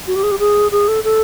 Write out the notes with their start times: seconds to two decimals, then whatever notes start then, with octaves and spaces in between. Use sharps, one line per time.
0.07 F#4
0.16 G4
0.23 G#4
0.31 G4
0.39 G#4
0.72 G#4
0.88 A4
1.04 A4